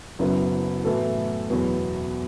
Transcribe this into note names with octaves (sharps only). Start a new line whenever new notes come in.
F#1 F#2 F#3 B3 E4
A2 E3 B3 F#4 A4
E2 B2 F#3 B3